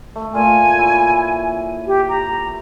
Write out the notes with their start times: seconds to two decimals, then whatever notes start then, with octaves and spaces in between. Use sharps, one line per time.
0.16 A3
0.34 A#2 F4 G#5 A5
0.79 E4 C#5
1.87 G4
2.09 A#5